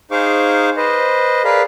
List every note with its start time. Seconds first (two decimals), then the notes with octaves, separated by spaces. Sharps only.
0.11 D#4 G#4 C5 F5 C#6 D6
0.77 B4 C5 D#5
1.44 G#4 A#4 B4 D5 F5 B5